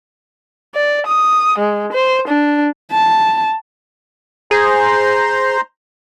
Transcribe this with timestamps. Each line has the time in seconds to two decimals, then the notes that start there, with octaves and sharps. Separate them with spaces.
0.75 D5
1.07 D#6
1.58 G#3
1.93 C5
2.28 D4
2.92 A5
4.51 G#4 C5 A#5 C6